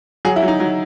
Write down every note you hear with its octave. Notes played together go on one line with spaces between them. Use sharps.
F#3 G#4
E4
F#3
D#4
F#3